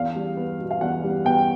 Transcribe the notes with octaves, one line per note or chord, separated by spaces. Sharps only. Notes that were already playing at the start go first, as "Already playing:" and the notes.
Already playing: E2 F5
G3
B3
B2
F5
E2 F#5
G3
B3 G5